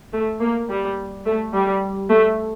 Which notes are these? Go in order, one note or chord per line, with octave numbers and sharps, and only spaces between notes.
A3
A#3
G3
A3
G3
A3